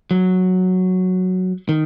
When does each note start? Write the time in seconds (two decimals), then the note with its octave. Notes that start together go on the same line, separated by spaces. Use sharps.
0.11 F#3
1.69 D#3